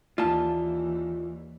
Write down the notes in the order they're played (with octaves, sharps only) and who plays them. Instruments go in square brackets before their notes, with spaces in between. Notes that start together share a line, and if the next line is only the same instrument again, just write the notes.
[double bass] D#2 E3 [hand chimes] A#3 D5 [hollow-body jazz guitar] F4 A5